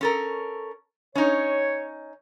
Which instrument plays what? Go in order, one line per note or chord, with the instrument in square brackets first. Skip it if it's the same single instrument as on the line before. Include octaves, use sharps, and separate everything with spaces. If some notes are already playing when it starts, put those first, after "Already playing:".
[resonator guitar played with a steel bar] C#4 A4 A#4
[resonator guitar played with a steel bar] C#4 D#4 [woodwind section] C#5